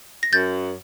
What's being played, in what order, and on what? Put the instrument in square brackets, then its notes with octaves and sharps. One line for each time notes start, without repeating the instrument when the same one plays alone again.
[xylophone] A#6
[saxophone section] F#2 [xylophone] G6 A6